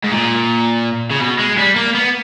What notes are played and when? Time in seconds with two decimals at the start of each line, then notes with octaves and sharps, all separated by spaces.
0.04 G#2
0.12 A#2
1.11 C#3
1.21 B2
1.39 G#3
1.58 G3
1.76 A#3
1.95 B3